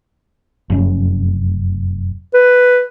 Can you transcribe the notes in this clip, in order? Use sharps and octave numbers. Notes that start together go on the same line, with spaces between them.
F1 F#2 C#4
B4